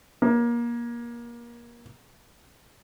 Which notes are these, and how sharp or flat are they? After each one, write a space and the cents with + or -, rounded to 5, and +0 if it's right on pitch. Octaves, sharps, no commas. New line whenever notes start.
A#3 +25